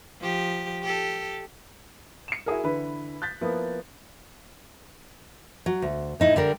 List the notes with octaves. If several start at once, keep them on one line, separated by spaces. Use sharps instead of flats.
F3 G4
G4 A4
C#7 E7
E4 F#4 G#4 A#4
D3 E3 B4 B5
F#6 G6 A6 B6
F3 A#3 B3 E4
F#3
D2
A2 D#4 E4
D3 G3 A#4 D5